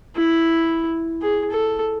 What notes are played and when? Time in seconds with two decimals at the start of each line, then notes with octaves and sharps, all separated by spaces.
0.16 E4
1.22 G#4
1.51 A4